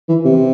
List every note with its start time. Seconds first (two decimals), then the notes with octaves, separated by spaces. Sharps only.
0.09 E3
0.25 C3